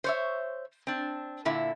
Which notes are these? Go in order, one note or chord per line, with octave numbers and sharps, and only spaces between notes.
C5 C#5 E5
C4 D4
A#2 D3 E4